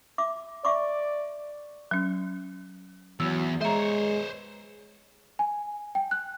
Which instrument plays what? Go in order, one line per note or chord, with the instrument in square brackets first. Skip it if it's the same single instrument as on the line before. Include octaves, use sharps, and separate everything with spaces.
[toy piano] E5 D6
[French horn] D5 [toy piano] E5 C#6 D6
[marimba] F#3 C#4
[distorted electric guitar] E2 [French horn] F#3 [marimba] E6
[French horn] G#3 [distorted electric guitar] C5 C#5 [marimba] E5 A#5
[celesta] G#5
G5
F#6